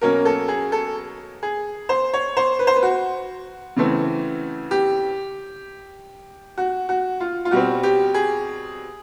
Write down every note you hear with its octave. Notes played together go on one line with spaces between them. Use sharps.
B2 F#3 A#3 C#4 A#4
A4
G#4
A4
G#4
C5
C#5
C5
B4
C5
B4
F#4
C#3 E3 A3 C4
G4
F#4
F#4
F4
F4
B2 G3 C4 F#4
G4
G#4